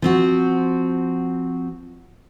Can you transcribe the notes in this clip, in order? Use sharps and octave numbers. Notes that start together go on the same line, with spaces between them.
F3 C4 F#4